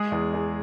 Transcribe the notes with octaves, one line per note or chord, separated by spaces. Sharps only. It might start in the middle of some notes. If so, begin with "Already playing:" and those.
Already playing: G#3 G#4
E2
E2